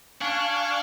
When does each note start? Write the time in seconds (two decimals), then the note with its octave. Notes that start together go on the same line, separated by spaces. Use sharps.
0.21 D4 F5 G#5 C#6